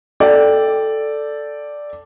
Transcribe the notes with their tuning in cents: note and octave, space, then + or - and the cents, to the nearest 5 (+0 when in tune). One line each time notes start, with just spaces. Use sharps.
A4 +0 D5 +0 G5 +0